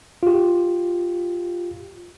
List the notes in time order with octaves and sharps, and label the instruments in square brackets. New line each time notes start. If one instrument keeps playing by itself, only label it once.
[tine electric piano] F4 G4